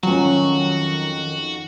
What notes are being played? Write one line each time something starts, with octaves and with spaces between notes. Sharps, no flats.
F2 D#3 F#3 C#4 F#4